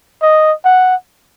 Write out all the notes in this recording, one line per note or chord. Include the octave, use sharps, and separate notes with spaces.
D#5
F#5